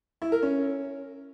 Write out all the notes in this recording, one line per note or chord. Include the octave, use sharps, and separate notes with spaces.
E4
A#4
C#4